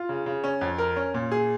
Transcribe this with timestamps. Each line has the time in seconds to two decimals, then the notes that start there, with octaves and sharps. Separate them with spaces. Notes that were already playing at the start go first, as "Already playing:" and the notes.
Already playing: F4
0.09 C#3
0.26 C#3
0.44 C#4
0.61 F2
0.78 A#4
0.96 C#4
1.14 A#2
1.32 G#4